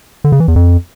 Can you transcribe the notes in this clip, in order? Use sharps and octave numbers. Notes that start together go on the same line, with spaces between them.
D3
C#3
E3
E2
F2